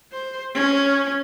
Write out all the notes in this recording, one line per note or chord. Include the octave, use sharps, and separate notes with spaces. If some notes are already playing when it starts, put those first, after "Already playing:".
C5
C#4